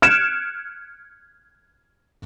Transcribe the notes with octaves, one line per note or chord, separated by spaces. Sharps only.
F6 F#6 G#6 C#7 D7 E7